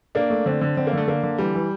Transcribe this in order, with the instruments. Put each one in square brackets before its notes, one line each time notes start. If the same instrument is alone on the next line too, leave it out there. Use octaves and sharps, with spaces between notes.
[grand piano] A#3 [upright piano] D4
[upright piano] A3
[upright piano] D3 [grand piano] C4
[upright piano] D3
[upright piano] D3 [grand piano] C4
[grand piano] A#3
[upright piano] D3 [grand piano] A3
[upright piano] D3 [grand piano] A#3
[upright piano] D3
[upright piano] E3 [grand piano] G3
[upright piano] E3